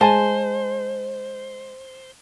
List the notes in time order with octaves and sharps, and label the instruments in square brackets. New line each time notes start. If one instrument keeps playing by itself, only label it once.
[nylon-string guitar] G#3 [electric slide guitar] C5 [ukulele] G#5 A5